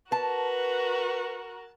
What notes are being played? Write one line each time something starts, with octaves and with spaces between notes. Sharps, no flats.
F#4 A#4 B4 A5